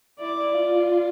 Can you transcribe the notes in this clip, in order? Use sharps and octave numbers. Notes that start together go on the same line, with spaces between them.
E4 D5
F4